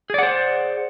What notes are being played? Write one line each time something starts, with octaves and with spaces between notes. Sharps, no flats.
G#4 C5 D5 F#5